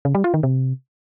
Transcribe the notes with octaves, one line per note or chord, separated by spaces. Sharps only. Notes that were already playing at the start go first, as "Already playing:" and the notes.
C#3
G3
F4
D#3
C3